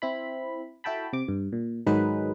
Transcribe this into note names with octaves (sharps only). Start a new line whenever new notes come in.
C4 E4 B5
E4 F#4 A4 G5 A5 B5
C3 D6
G2
A#2
G#2 D#3 F#3 G#3 D#4 B4